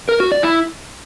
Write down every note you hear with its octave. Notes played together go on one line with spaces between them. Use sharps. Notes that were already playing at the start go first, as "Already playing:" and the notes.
A#4
F#4
D5
E4